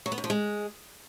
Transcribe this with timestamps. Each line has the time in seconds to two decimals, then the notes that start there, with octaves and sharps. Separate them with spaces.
0.06 F#3
0.12 B3
0.18 F#2
0.24 F3
0.30 G#3